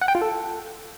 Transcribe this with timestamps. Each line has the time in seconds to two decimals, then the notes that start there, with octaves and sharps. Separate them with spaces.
0.01 F#5
0.08 G5
0.15 F4
0.21 A4